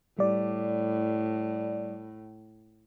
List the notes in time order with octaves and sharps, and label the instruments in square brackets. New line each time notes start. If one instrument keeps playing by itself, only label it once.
[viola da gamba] A2 [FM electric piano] G3 D5